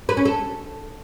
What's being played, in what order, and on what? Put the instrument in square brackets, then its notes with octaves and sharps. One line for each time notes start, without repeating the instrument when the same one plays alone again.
[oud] B4
C#4
A4